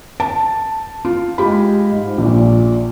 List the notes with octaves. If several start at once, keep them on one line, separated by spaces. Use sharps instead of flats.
A5
F4
G#3 F4 G4 B5
G#2
A#1 A#2